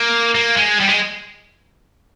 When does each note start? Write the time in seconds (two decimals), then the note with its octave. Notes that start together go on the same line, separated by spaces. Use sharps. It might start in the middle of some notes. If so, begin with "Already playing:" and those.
Already playing: A#3
0.35 A#3
0.57 G#3
0.80 G3
0.88 G#3